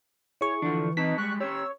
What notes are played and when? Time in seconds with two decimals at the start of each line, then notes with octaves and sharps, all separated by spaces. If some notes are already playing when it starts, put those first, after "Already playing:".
0.41 E4 G#4 C#5 C#6
0.62 D3 E3 F3 D4
0.97 C4 D#4 B4 A5 B6
1.18 G3 G#3 C#6 F#6
1.40 C#4 G4 C#5 E6